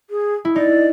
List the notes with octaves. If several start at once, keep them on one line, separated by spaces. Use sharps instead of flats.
G#4
E4
D#4 D5